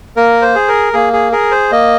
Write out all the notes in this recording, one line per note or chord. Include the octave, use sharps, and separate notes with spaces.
A#3 A#4
C5
G#4
A#4
A#3 G#4
G#4
G#4 A#4
C5
A#3 D#5